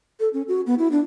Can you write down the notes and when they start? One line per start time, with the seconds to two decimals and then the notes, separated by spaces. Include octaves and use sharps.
0.20 A4
0.33 C#4
0.48 F#4
0.67 B3
0.79 E4
0.91 D4